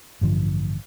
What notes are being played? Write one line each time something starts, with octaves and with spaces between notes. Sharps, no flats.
A1 G2 D3 F3